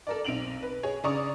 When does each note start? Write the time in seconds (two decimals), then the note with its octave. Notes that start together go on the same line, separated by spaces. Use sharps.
0.07 A4 A#4 D5
0.25 B1 C4 D7 F7 F#7
0.63 B4
0.83 G#4 C#5
1.04 C#3 D5 A#5 C#6 D#6 F7